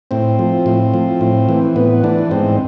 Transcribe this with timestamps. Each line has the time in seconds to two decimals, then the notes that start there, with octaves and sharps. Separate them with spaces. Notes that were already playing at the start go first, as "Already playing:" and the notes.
0.11 A2 C4
0.39 F3
0.66 A2
0.94 F3
1.21 A2
1.49 E3
1.76 A2 B3
2.03 E3 D4
2.31 G#2 C4